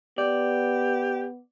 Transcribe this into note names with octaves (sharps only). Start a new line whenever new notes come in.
B3 G4 D5